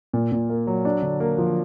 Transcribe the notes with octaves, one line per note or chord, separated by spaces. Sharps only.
A#2
A#2
A#3
F#3
D4
D3
A#3
F3